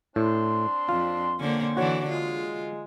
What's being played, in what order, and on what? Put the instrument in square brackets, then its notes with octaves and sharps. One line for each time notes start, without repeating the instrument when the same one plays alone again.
[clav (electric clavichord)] A2 [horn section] C4 D4 C6
[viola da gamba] F2 [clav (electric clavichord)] F4
[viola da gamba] D3 A#3 [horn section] D#3 C#4 C5
[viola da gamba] D3 E3 [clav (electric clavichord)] F#4 C#5
[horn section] G#3 [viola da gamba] F4